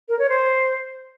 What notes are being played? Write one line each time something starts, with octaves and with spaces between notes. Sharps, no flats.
A#4
C#5
C5